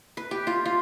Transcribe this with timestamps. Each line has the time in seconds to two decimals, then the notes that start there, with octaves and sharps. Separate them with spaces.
0.17 B4
0.31 G4
0.47 F4
0.65 F4